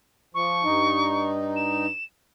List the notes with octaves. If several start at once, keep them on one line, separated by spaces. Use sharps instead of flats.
F3 C#6
G2 D#4
E7